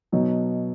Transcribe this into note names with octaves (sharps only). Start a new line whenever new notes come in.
B2 F#3 D#4